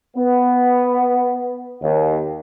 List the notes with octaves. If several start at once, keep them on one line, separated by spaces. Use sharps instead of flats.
B3
D#2